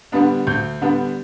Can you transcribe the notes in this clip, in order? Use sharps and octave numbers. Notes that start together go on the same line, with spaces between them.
D3 G3 B3 D4
D2 G6
D3 G3 B3 D4